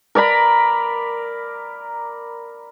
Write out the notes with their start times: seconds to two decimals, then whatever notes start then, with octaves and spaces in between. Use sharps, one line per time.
0.15 A#4 D5 A#5 B5